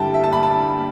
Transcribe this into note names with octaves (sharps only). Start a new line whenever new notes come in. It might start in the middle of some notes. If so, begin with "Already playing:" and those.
Already playing: G2 D3 G3 E4 G5 A5
E5
A5
B5
A5